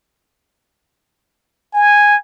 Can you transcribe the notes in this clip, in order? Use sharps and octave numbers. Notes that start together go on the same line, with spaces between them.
G#5